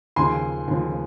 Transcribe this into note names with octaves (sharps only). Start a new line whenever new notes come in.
D#2 C#3 F3 G#5 C6
D#2 C#3 F3